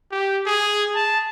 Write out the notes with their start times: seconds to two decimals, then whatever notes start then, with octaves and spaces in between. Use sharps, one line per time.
0.12 G4
0.46 G#4
0.95 A5